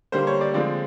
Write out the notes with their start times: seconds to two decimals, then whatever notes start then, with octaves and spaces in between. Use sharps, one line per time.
0.12 D3 G3 A#3 C5
0.27 C#5
0.41 D5
0.54 D3 F3 G#3 C4 D5